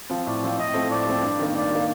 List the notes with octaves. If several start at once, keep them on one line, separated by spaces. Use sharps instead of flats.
F3 C4 F4
A2 D5
F3 C4 F4
A2 D#5
F3 A3 C4
A2 D5
F3 A3 C4
G2
D#3 A#3
G2 D5
D#3 A#3